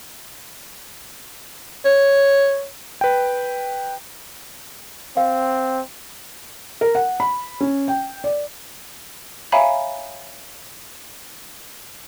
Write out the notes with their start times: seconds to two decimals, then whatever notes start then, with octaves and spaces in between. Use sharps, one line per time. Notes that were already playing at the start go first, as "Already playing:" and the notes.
1.86 C#5
3.01 B4 G5
5.17 C4 F5
6.81 A#4
6.95 F#5
7.20 B5
7.61 C#4
7.88 G5
8.24 D5
9.52 C#5 E5 F5 G#5 A#5 B5